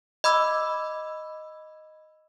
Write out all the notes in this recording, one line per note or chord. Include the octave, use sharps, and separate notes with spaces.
D#5 B5 D6 E6